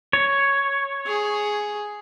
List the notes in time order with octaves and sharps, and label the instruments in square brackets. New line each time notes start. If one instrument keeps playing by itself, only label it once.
[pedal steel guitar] C#5
[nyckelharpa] G#4